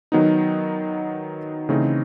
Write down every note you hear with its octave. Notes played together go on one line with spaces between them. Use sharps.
D#3 F#3 B3 D#4
C#3 E3 A3 C4 D#4